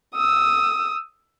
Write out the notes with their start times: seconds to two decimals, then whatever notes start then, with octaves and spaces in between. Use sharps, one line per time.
0.15 D#6 E6